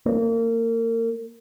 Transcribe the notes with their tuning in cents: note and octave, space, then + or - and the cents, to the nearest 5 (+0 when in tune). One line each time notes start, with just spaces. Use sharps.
A#3 -30